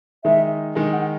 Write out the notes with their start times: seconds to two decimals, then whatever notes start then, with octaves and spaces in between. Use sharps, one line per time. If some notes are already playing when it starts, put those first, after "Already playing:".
0.24 D#3 G#3 D#4 E5
0.75 D#3 G#3 D#4
0.93 F#5